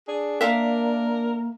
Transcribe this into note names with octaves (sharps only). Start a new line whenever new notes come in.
D4 G#4
A#3 A#4 E5 F5